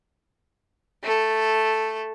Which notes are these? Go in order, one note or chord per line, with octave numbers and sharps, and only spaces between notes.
A3 A4